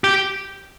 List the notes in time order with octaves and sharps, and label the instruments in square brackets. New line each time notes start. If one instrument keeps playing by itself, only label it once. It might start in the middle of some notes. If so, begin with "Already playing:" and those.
[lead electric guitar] G4